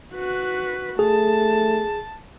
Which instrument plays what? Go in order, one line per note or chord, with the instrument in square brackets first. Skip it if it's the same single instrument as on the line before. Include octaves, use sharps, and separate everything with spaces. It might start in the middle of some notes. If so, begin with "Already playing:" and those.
[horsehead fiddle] F#4 B4
[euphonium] A3 [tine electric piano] G#4 [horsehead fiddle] A5